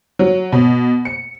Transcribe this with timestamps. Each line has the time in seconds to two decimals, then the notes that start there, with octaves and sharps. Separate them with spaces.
0.19 F#3
0.52 B2
1.05 C#7